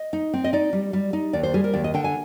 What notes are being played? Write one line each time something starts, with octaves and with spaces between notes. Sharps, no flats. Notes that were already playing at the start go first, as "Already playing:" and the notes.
Already playing: D#5
D#4
C4
D#5
D#4 D5
G3
G3
D#4
D#2 D5
C5
G3 G#4
A#4
D#2 D5
D#5
D3 G5
G#5